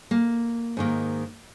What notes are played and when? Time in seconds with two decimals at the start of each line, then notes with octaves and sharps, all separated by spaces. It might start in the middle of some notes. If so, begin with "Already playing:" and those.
0.11 A#3
0.77 G#2 D#3 A#3